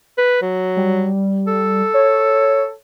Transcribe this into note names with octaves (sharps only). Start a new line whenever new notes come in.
B4
F#3
G3
A4
C#5